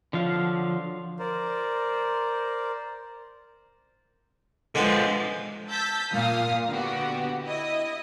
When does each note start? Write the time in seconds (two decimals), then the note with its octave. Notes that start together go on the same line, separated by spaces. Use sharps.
0.13 D3 F3 F#3 F5
1.19 A#4 C5 D5
4.75 D3 F3 G#3 B3
5.68 A5 E6 G6 A6 B6
6.12 A#2 F5 D#6 F6
6.68 D3 B3 F#4 G4
7.44 E4 D#5